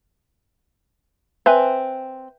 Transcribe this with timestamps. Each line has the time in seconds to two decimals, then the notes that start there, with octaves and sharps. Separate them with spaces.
1.46 C4 B4 E5 G#5